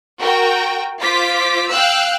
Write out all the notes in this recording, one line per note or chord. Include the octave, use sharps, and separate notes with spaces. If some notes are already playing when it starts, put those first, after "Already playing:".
F#4 A#4 G5
F4 C5 D6 B6
F5 G5 E6 F#6